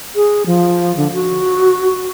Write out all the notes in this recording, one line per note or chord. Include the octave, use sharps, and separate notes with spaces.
G#4
F3
D3
F#4